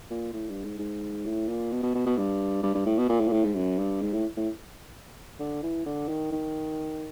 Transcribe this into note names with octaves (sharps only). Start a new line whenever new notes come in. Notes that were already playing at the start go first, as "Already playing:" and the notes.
A#2
A2
G2
G#2
G#2
A2
A#2
B2
B2
B2
B2
G2
G2
G2
A2
B2
A#2
A2
A#2
A2
G#2
F#2
G2
G#2
A2
A2
D3
E3
D3
D#3
D#3